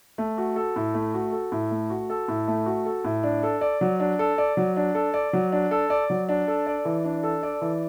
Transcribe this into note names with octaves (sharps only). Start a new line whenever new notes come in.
A3
F#4
A4
A2
A3
F#4
A4
A2
A3
F#4
A4
A2
A3
F#4
A4
A2
D4
A4
D5
F#3
D4
A4
D5
F#3
D4
A4
D5
F#3
D4
A4
D5
F#3
D4
A4
D5
E3
D4
A4
D5
E3